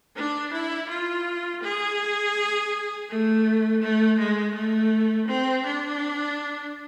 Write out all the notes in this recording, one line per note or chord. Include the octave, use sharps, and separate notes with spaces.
D4
E4
F4
G#4
A3
A3
G#3
A3
C4
D4